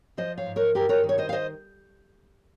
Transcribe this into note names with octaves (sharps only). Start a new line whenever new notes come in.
F3 C5 D#5
C#5 F5
G#2
A#4 C#5
G2 G4 A#4
A#4 C#5
D#3
C#5
C5 D#5
F5
C5 D#5